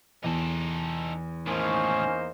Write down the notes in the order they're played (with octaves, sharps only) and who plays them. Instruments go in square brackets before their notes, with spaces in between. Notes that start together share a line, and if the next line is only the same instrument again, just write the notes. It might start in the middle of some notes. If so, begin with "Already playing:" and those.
[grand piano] E2 [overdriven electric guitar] D#4 A4
[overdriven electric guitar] A2 D#3 [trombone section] A#3 D#4 C5 [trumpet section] C#4